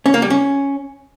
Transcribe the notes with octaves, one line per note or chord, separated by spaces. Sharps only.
C#4
A#3
G3
C#4